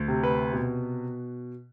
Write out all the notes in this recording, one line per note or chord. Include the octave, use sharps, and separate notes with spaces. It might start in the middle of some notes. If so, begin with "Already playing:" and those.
Already playing: D2
C3
B4
B2